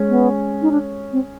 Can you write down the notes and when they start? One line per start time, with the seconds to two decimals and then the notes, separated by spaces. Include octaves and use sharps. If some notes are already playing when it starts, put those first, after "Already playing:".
Already playing: G#3 C#4
0.09 B3
0.62 D#4
0.71 D4
1.13 C4